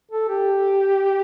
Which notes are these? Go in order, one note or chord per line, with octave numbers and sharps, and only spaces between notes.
A4
G4